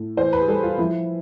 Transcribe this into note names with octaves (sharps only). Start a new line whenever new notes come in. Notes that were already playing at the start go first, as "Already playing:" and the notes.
Already playing: A2
E3 C5
B4
G#4
G3 A4
F4
F3 E4